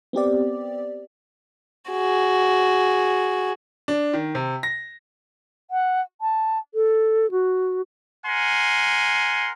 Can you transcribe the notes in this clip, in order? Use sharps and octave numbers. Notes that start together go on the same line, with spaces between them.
B3 C4 G4 D5
F#4 G#4
D4
D#3
C3
A#6
F#5
A5
A4
F#4
A#4 F#5 G#5 C6